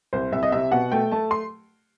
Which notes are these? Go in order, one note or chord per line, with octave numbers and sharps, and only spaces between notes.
C2 C5
C2 E5
D#5
C3 E5
B2 F#5
A3 G5
A3 A5
C6